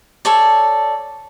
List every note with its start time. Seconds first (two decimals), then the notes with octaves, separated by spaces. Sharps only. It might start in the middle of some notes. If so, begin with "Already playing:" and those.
0.25 A4 C#5 D5